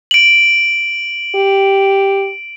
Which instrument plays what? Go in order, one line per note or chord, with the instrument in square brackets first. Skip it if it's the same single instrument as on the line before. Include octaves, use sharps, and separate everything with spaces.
[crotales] D7 F#7
[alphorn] G4